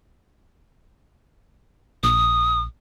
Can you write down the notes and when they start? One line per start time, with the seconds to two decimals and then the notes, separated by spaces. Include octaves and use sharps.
2.03 A#1 D#6